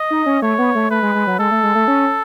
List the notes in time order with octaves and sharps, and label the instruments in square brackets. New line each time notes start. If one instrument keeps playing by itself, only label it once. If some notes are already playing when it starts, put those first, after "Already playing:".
Already playing: [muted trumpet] D#5
[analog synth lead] D#4
C#4
[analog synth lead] A3 [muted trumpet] C#5
[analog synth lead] B3
A3
[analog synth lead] A3 [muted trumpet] B4
[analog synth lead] G#3
G#3
F#3
[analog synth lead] G#3 [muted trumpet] A4
[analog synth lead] A3
G#3
A3
C#4